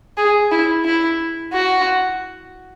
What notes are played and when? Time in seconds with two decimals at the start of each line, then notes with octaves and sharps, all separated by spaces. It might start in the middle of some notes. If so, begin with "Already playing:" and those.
0.17 G#4
0.51 E4
0.85 E4
1.53 F#4